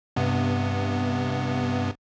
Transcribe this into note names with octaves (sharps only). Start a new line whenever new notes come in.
G2 C3 B3